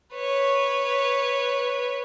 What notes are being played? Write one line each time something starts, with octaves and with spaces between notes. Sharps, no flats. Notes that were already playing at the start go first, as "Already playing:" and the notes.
B4 C#5